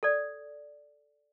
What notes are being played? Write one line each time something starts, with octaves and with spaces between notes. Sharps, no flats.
A4 D5